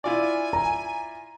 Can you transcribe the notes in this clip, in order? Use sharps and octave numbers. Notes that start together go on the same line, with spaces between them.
E4 F4 D5 G#5
A#5